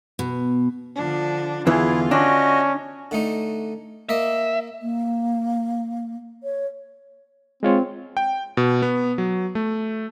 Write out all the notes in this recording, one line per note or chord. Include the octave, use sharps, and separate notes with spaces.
B2
D3 F3 D4
E2 D3 E3 E4 F4 G#4
C#4 D4 F#4 D#5
D3 A3 D#4
A#3 D#5 E5
A#3
C#5
G#3 C4 F4 C#5
G5
B2
B3
F#3
A3